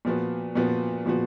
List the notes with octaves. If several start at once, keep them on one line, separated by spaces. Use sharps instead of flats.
A#2 F3 B3 F#4
A#2 F3 B3 F#4
A#2 F3 B3 F#4